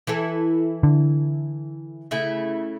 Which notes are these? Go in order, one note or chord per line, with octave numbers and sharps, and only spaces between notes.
E3 E4 A4
D3
C#3 A3 E4